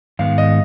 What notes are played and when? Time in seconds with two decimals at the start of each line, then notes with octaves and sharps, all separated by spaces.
0.19 G#2 D#3 G#3 B3 F5
0.38 D#5